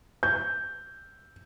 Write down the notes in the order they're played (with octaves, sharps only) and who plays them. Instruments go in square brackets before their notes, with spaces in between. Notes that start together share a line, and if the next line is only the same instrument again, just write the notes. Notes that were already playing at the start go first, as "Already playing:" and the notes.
[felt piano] G6